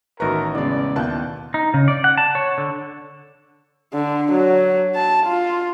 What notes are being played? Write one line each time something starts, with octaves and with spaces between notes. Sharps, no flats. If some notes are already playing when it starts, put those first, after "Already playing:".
A1 B2 D#3 A#4 B4 E5 A#5 C#6
E2 C#3 G#3 E4 D5
D#2 B2 E4 A5 F#6 G6
D#4
C#3
D5
F#5
A5
C#5
D3
D3
F#3
A5
F4